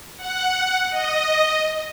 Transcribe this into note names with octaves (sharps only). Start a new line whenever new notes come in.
F#5
D#5